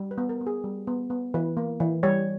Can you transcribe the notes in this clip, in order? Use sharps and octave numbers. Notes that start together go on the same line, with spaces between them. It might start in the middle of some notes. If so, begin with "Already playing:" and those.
Already playing: G3
B4
B3
A#4
B3
G#4
G3
B3
B3
E3 B4
A#3
E3
G3 C#5